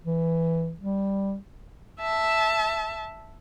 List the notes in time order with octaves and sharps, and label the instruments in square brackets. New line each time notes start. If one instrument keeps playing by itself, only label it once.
[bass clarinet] E3
G3
[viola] E5 A5